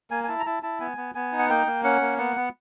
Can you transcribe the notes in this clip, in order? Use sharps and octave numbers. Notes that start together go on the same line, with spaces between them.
A#3 G#5
G#5
E4 A5
A#5
E4 A5
E4 A5
B3 G#5
B3
B3 G#5
D#4
F#5
A#3 G5
A#3
C#4 F#5
A#3
B3 F#5
B3